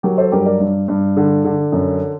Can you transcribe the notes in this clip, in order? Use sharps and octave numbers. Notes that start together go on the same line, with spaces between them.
F#3 G4 A#4
A4 C5
G2 G4 A#4
A#4 D5
G2
G2
D3
D3
F#2